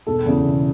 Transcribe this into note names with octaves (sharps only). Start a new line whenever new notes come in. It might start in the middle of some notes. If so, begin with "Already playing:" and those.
E1 A4
E2 C#3 E3
E1